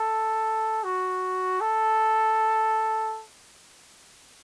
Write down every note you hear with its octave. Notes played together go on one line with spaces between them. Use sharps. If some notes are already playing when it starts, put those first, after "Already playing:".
Already playing: A4
F#4
A4